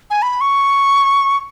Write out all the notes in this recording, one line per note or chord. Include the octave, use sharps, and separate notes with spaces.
G#5
B5
C#6